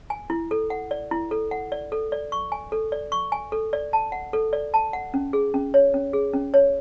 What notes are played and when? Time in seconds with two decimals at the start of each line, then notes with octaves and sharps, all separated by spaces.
0.10 G#5
0.30 E4
0.51 A4
0.70 F#5
0.91 D5
1.11 E4
1.31 A4
1.51 F#5
1.72 D5
1.92 A4
2.12 D5
2.32 C#6
2.52 G#5
2.72 A4
2.92 D5
3.12 C#6
3.32 G#5
3.52 A4
3.73 D5
3.93 A5
4.12 F#5
4.33 A4
4.53 D5
4.74 A5
4.93 F#5
5.14 C#4
5.33 G#4
5.54 C#4
5.74 C#5
5.94 C#4
6.13 G#4
6.34 C#4
6.54 C#5